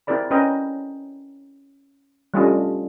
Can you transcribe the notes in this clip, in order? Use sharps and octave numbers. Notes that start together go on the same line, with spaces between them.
C4 E4 G#4 A#4 D5 B5
C#4 B4 D5 D#5 G5 A#5
G3 A3 C#4 D4 F4 D#5